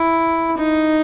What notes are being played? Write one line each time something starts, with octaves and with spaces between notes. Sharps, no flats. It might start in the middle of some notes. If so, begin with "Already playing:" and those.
Already playing: E4
D#4